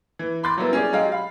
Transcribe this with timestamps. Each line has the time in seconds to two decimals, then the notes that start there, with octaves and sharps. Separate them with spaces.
0.19 E3
0.43 B5 C6 D6 G6 A6
0.57 F#3 G3 A#3 B3 E4
0.73 C#4 G#4 D5
0.93 F#3 G#3 G4 F5
1.12 F5 B5